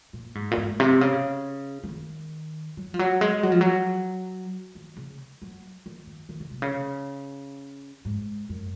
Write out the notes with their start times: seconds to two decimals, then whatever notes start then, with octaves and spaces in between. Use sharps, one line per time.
0.13 A#2
0.35 G#2
0.51 A#2
0.57 G#2
0.80 C3
1.01 C#3
1.84 F3
1.89 D#3
2.77 F#3
2.94 F3
2.99 F#3
3.21 G#3
3.43 F#3
3.52 F3
3.61 F#3
4.75 D#3
4.97 C#3
5.42 F#3
5.86 D#3
6.07 D#3
6.29 D#3
6.40 C#3
6.51 C3
6.62 C#3
8.05 G#2
8.49 F#2